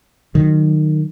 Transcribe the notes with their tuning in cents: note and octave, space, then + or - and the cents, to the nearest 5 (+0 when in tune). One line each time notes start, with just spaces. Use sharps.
D#3 -25 F#3 +0